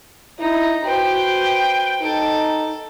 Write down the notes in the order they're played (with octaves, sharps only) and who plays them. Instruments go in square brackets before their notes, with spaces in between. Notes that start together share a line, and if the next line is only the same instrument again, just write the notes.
[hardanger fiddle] D#4 [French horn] E4
[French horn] F#4 [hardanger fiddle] B4 C5 [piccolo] G5
[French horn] D#4 [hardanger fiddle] A4